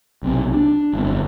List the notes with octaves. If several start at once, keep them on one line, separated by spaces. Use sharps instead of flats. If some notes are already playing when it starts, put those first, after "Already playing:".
B1 C3
D4
G1 F2